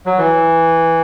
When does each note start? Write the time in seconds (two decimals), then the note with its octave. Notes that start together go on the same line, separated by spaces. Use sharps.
0.06 F#3
0.18 E3